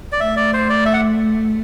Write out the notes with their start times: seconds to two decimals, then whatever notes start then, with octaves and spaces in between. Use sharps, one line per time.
0.12 D5
0.20 A3 E5
0.36 D5
0.53 C5
0.69 D5
0.85 E5
0.93 F#5